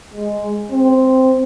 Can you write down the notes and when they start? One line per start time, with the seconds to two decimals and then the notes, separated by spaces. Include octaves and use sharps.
0.14 G#3
0.71 C4